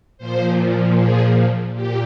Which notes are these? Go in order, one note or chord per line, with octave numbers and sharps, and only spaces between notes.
A#2 F3 C5
G#4
A#2 G4